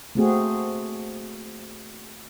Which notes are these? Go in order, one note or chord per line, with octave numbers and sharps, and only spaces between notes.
A3 A#3 C4 F#4 G#4